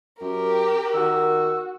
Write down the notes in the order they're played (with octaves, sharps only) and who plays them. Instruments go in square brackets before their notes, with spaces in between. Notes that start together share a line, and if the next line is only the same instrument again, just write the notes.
[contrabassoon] F#2 [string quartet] G4 A#4
[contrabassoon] D#3 [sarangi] F#4 [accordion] E6